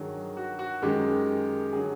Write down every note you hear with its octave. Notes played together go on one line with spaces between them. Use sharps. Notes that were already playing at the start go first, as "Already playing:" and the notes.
Already playing: G2 D#3 F#3 G#4
F#4
F#4
F#2 D#3 G#3 G4
D3 F#3 G#4